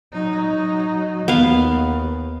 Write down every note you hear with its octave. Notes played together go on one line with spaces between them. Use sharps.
F#3 D#4
D#2 B3 F5